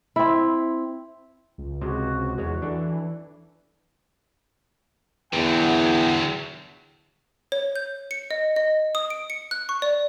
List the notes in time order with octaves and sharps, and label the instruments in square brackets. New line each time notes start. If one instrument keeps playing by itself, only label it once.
[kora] C4 E4
[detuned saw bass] C#2
[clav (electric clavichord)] C3 G#3 C5 [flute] F#4
[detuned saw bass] E2 [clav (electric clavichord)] G#3 C#5
[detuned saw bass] E3 [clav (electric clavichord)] D4 A4
[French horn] E2 [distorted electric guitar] D3 F#3 [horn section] B4 G5
[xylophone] C#5
G6
C#7
D#5
D#5
D#6
D7
C#7
F#6
C#6
D5